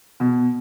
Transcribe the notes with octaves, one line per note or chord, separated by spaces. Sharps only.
B2